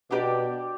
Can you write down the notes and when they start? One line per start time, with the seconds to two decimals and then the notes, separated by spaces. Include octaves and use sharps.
0.11 B2 D4 G4 B4 D5